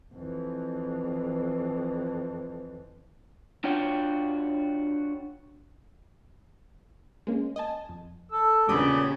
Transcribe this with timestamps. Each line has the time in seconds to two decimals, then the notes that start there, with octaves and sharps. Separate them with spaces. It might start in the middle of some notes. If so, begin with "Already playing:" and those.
0.14 F2 E3
3.64 D4 F4 F#4 C#5 G5
7.27 G#3 A#3 C#4
7.56 D#5 G#5 A5
7.89 F2
8.32 A4 E6
8.68 E2 A#2 C#3 B3 D4 G4 G5 D#6